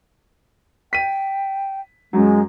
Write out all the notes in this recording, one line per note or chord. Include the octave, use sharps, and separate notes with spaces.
G5 B6 D#7
F#2 F#3 G#3